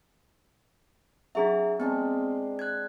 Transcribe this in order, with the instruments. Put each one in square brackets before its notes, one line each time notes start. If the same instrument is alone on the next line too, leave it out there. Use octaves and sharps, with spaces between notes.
[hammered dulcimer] F#3 A#5 [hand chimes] D4 G#4 E5
[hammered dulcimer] G#3 C4 D4 [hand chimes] B3
[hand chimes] F#6 G#6